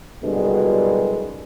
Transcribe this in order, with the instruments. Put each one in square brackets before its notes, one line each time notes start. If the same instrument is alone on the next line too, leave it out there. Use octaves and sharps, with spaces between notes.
[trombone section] C2 G2 B2 D3 F#3 G#3